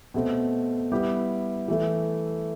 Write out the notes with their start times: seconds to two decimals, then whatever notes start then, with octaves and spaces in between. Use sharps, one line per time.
0.14 B2 A3 C4
0.92 G3 B3 E4 G4
1.68 E3 A3 E4